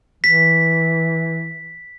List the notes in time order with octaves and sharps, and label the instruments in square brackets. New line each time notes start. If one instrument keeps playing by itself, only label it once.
[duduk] E3 [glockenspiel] B6